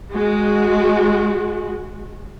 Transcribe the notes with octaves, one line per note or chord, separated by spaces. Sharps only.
G#3 F#4